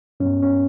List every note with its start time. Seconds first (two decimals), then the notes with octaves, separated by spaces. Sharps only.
0.20 G2 F#3 B3 C#4
0.42 C#4